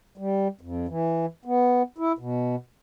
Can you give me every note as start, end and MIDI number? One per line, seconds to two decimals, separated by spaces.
0.17 0.48 55
0.61 0.87 41
0.88 1.26 52
1.45 1.82 59
1.98 2.12 64
2.19 2.56 47